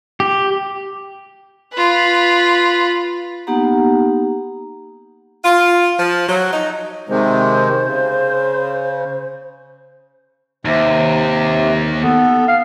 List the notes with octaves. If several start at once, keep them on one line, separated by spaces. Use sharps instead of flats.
G4
F4 B4
A#3 B3 D#4 G4 F#5 A#5
F4
F3
F#3
D#4
C3 D#3 G#3 C5
C#3
D#2 C3
B3 A4
F5